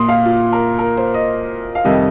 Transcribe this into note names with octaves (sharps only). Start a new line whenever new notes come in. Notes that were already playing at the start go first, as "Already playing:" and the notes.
Already playing: A#2 A#3 C6 D#6
F5
F4
A#4
A#4
C5
D#5
F5
F2 C3 D#3 G3 D#5